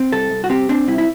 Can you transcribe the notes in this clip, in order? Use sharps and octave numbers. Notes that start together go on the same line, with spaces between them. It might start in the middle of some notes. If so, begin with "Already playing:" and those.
Already playing: C4
C2 A4
C2
F#4
C4 G4
C4 D4
C2 E4
E4